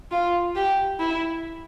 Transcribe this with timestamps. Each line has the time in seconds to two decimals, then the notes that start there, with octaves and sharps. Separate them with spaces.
0.11 F4
0.56 G4
1.00 E4